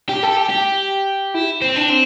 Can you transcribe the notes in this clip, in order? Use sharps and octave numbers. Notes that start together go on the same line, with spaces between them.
G4
A4
G4
G4
E4
C4
D4
C4